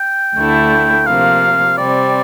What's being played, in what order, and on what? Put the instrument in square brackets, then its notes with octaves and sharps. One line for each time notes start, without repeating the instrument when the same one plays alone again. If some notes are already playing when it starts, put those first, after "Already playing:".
Already playing: [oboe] G5
[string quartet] D2 D3 A3 E4
[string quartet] C3 F3 A#3 [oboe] F5
[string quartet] C3 G3 C4 [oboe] D5